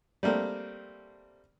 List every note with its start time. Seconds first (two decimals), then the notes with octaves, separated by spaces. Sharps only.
0.23 G3 A3 A#3 C4 D4